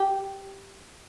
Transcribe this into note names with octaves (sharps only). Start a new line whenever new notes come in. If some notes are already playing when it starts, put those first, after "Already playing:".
Already playing: G4